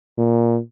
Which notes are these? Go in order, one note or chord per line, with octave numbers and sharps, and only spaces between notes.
A#2